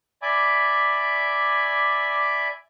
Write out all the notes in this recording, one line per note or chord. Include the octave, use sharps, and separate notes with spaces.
D5 E5 G#5 B5 D6